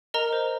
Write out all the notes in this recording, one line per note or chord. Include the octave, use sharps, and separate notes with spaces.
A#4 D#5 A#5
C5